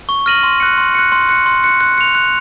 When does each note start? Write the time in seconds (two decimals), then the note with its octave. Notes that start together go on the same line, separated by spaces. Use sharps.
0.09 C#6
0.26 F6 A#6 D#7 F#7
0.43 C6
0.60 F#6 C#7
0.78 C6
0.95 F#6 C#7
1.12 C6
1.29 F#6 C#7
1.46 C6
1.64 F#6 C#7
1.81 F#6
1.98 C#7 F7
2.15 F#6